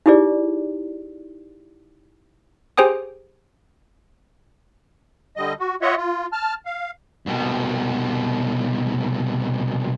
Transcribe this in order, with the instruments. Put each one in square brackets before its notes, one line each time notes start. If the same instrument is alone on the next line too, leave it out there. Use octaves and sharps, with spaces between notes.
[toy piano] D#4 E4 G4 G#4 D5
[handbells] G4 G#4 C5 G5 G#5 D#6
[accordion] D3 G3 D#5
F#4
F4 C#5 D#5 E5 F#5
F4
A5 F6
F5
[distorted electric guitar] C2 B2